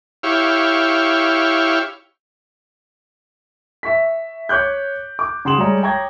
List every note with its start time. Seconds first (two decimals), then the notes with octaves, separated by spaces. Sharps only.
0.23 E4 G4 C#5 F5
3.83 E5 C#6 B6
4.49 C#5 D6 F#6 G6
5.19 D6
5.45 C#3 F#5 C6 D#6 E7 F#7
5.58 G3 G#3 C#5 A#5
5.83 C#5 G5 A#5 C#6 G#6 A#6